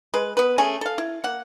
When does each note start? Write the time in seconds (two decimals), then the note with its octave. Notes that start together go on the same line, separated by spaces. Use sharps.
0.14 G#3 B4
0.37 B3 B4
0.58 A3 C#4 G#4 G#5
0.81 A4 F5
0.98 E4
1.24 A#3 F#5